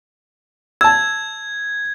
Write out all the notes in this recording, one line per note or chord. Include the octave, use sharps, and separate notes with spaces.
A5 E6 G#6